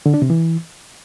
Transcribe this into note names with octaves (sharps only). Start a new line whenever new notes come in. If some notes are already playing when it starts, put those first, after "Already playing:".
D3
D4
C3
E3